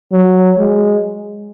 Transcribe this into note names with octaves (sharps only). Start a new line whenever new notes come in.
F#3
G#3